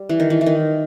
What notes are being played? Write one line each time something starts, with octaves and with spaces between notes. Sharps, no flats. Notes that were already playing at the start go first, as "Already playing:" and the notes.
Already playing: G3
E3
D#3
E3
E3
D#3